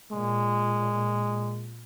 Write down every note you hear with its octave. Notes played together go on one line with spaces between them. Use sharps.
A#2 G#3